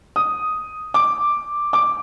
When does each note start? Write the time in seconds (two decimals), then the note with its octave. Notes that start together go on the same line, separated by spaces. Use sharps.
0.16 D#6
0.94 D6
1.73 D6